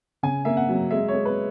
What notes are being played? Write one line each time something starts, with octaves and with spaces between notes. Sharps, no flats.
C#3 G#5
A#3 E5
F#5
F#3
G#3 E5
C#5
G#3
B4